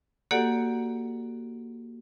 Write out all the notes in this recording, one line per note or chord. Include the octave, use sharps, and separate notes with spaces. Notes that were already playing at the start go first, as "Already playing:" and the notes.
A#3 F#4 G4 A4 D5 F#5